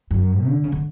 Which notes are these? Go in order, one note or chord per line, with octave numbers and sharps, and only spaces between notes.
F#2
D3
C#3
D3